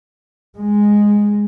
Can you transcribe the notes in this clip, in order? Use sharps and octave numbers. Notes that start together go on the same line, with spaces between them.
G#3